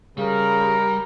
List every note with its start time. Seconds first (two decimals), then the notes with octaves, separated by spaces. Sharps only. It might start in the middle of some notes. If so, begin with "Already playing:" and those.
0.18 C#3 G3 A#4